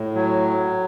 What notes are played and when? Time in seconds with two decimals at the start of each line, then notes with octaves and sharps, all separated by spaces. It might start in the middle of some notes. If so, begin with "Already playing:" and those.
Already playing: A2
0.15 F#3